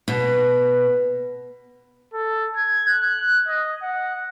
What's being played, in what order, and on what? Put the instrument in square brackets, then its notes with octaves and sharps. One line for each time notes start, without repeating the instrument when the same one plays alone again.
[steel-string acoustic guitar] B2
[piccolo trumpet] A4
G#6
F#6
D#5
F#5